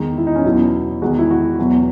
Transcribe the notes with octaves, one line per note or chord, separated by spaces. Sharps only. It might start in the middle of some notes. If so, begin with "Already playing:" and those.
Already playing: E2 D#3 G#3
E4
D#4
C#4
E2 B2 F#3 E4
E2 D#3 G#3 F#4
E4
F#4
E2 B2 F#3